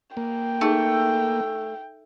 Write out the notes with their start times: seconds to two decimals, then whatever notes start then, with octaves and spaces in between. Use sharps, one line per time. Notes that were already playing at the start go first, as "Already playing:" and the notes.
0.17 A#3 G5
0.61 A3 D#4 G#4 E5